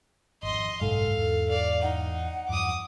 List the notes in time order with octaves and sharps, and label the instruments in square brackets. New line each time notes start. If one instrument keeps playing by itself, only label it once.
[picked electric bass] G#1 F2 [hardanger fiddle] D#5 C6
[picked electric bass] F#1 B1 [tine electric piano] G#2 [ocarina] A4 [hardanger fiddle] F5
[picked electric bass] E2 E3
[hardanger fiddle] D5 F5
[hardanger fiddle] D#4 [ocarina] F#5
[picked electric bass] E2 G2 F3 [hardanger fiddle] D6 D#6